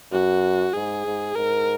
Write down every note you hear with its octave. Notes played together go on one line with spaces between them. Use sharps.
F#2 F#4
G#2 G#4
G#2
G#2 A#4